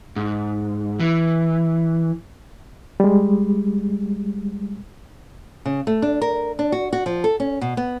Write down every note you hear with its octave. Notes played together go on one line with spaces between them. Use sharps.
G#2
E3
G3 G#3
C#3
A3
D4
A#4
D4
F#4
F#4
F3
A4
C#4
B2
B3